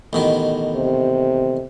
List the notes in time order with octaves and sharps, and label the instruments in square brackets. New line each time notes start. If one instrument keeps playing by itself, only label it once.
[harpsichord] A1 B2 D#3
[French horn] C3